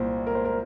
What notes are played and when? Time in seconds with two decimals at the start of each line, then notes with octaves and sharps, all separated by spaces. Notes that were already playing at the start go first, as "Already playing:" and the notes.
Already playing: C2 A#2 C5
0.26 A#4
0.35 C5
0.45 A#4